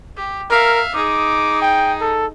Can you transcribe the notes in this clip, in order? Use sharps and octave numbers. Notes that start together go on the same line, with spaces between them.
G4
A#4 E5 F5
D#4 G#4 D6
G5
A4